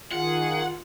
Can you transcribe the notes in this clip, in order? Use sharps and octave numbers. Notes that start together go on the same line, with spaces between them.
D#3 F4 G#4 F#5